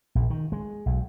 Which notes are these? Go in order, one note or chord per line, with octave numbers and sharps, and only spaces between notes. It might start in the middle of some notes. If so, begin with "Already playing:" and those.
A#1
D#3
G#3
B1